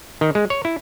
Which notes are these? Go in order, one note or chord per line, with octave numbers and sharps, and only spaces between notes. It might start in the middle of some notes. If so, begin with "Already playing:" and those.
D#3
G#3
C#5
E4